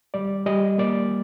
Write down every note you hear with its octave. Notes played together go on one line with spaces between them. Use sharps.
G3 D5
G3 D#5
A#3 D5